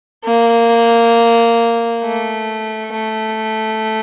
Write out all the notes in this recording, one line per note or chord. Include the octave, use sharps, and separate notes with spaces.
A#3
A3
A3